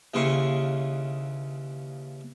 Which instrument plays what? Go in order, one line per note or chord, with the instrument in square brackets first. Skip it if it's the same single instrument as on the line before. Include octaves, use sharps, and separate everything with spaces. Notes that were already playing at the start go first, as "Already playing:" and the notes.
[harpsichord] D#2 C#3 E3 C6 C#6